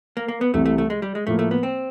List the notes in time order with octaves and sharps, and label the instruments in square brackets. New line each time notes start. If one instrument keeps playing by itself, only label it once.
[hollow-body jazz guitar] A#3
A#3
B3
[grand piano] C2 C3 E3 [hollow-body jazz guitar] A3
[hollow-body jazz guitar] A3
A3
G#3
G3
G#3
[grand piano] A2 F3 A#3 [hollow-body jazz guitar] A3
[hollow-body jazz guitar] A3
B3
C4